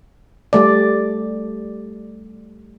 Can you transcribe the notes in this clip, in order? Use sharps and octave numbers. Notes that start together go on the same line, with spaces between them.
G3 A3 D5